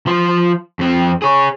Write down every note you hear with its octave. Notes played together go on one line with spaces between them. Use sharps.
F3 C5
F2 C4
G#4 C#5